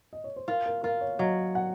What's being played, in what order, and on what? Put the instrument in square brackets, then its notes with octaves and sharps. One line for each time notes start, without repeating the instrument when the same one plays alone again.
[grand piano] D#5
C#5
C5
[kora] F4 [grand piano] A#4
[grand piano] A#4
[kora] F4 [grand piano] A#4
[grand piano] C#5
[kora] F#3 [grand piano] D#5
[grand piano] F#5